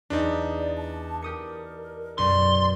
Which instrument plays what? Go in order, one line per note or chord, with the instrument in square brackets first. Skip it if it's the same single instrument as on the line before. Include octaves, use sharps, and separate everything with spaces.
[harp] E2 [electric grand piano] D4 D#4
[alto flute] D5
A5
[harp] G4 D#6 C#7 [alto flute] A#4
[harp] B1 F#2 [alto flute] D5 [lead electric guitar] C6